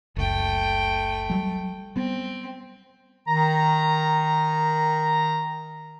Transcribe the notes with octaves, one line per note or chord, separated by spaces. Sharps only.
F#1 C#2 F#2 A3 G5
F#3 G3
G3 B3 C4
D#3 A#5